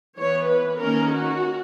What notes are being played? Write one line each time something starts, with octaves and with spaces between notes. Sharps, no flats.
E3 B3 C#5
B4
D#3 A#3 C#4 A#4
F#4